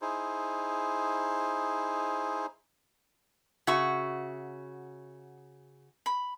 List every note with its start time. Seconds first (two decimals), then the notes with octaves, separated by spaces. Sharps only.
0.02 D#4 E4 G#4 C5
3.67 C#3 F#4 E5 C#6
6.06 B5